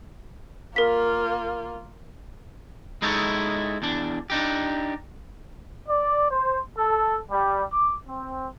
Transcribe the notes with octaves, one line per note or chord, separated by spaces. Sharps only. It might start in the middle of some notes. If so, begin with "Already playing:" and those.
A#3 F4 A#4 B6
G#3 D#4 E4 A4 C#5
E2 D4
D4 D#4 G4
D5
C5
A4
G3
D6
C4